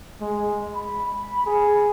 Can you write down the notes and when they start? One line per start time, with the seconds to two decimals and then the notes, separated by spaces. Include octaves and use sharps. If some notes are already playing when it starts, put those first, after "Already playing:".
0.21 G#3
0.76 B5
1.46 G#4